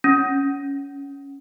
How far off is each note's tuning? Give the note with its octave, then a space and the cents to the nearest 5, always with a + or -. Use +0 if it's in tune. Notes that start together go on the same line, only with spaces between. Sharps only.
C#4 -5